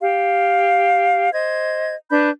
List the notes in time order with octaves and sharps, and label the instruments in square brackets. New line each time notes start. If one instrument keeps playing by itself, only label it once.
[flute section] G4 F5
C5 D#5 G#6
D4 B4 B5 G6